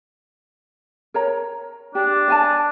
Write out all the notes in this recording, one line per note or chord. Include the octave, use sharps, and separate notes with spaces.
A#4 C#5 A#5
D4 G4
D5 G#5 A5